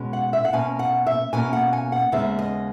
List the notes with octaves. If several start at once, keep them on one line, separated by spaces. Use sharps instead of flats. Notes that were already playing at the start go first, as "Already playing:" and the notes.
Already playing: B2 G#3 C#4
F#5
E5
F#5
B2 A#3 C#4 G#5
F#5
E5
B2 A#3 C#4 G#5
F#5
G#5
F#5
D#2 C#3 G#3 B3 E5
D#5